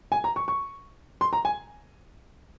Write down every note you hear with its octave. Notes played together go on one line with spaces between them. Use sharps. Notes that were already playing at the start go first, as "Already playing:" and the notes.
G#5
A#5
C#6
C#6
C6
A#5
G#5